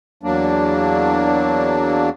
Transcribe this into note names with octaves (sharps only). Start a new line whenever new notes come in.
E2 F#3 A#3 D4